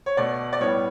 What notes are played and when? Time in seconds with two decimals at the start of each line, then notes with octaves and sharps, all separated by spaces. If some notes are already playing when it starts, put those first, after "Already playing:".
0.06 C#5
0.17 B2 A3 D5
0.53 D5
0.60 A2 G3 B3 C#5